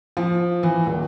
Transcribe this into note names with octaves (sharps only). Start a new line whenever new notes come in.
F3
E3
D#1